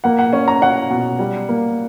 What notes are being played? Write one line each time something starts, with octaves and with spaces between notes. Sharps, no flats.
A#3 F#5
F#5
C#4
A#5
C#4 F#5
B2
G3
A#3